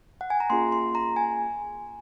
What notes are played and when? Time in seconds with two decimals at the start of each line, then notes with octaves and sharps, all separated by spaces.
0.21 F#5
0.30 G#5
0.40 A#5
0.50 A#3 C#4 F4 G#4 C6
0.72 C6
0.95 A#5
1.16 G#5